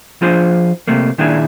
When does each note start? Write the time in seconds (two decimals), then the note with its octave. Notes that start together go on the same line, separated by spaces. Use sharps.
0.22 F3 D4 F4 G#4 C5
0.87 C3 A3 A#3
1.18 A#2 D#3 D4 E4 G#4